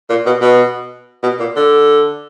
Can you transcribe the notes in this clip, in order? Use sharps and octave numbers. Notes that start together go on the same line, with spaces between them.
A#2
B2
B2
B2
A#2
D3